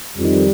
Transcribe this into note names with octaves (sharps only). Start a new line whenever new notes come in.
F2 D#3 G3